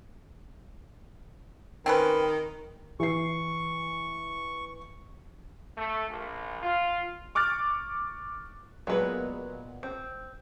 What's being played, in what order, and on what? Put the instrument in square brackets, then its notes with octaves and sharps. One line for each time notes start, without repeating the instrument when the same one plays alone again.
[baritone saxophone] D#3 [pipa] C4 C#4 B4
[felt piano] E3 C7 [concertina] C#6
[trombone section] A3
A#1
F4
[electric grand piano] C#6 D6 F6 F#6 A6
[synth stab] A#2 G#3 B3 [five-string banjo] F#3 B4
[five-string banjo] C4